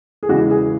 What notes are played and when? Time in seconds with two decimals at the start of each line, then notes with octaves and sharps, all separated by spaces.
0.23 G#4
0.29 E2 C#3 E3 G#3 F#4
0.50 G#4